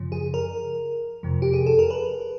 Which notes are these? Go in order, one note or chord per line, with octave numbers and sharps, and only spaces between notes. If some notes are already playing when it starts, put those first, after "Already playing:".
Already playing: F#2 C#3 F3
G#4
A#4
F2 C3 F3
G4
G#4
A4
A#4
B4